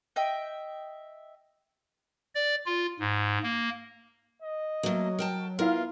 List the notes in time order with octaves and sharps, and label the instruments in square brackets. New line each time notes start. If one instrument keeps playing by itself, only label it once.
[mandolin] D#5 E5 G5
[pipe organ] D5
F4
G#2
A#3
[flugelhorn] D#5
[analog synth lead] F#3 [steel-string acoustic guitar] A3 A#3
[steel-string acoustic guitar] A#4 G5 A5
[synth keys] B3 E4 F5 [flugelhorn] F4 [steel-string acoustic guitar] A#4